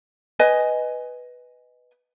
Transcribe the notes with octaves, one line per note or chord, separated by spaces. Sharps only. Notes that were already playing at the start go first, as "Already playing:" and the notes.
B4 D#5 G#5